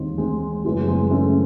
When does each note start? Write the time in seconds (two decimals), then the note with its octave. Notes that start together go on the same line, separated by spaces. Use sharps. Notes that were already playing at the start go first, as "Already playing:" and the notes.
Already playing: E1 D#2 D#3 C4 D#4
0.18 G#3 C4
0.64 F#1 F#2 E3 G#3
0.88 G#3 C4
1.11 A3 C#4